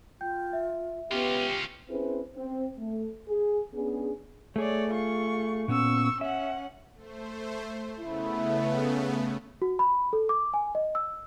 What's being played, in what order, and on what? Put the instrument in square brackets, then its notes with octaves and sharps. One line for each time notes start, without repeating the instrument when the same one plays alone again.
[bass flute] F4 [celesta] G5 G6
[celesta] E5
[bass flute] B3 [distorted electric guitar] C#4 F4 [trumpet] G4
[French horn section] C4 C#4 E4 G#4 B4 C5
C4
A3
G#4
B3 C#4 D4 G#4
[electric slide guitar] A3 G#4 [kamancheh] C#5 D5
[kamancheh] F4 C#6
[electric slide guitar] A#2 B3 C#4 [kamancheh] C#6 E6
[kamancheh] C#4 F#5 [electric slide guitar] E5
[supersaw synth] A3 C5
[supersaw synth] C#3 A3 B3 [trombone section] E4
[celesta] F#4
B5
A4
D6
G#5
D#5
E6